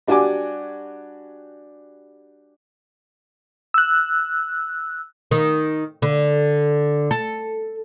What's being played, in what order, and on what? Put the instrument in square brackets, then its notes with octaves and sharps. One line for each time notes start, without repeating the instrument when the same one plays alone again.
[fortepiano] G3 D4 F#4 G4 G#5 D6
[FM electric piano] E6 F#6
[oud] D#3
D3
A4